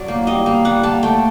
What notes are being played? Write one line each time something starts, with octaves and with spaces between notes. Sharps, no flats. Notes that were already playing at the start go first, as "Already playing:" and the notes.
Already playing: F#3 D5
A#3
G3 D#5
A#3
G3 F#5
A#3 A5
A3 G5